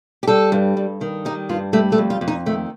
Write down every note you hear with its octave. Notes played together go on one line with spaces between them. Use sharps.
G4
G3 A4
G2
G2
D#3
G3 D#4
G2 F4
G3 A3
A3
F2
F4
F2
D#4
D#3 A3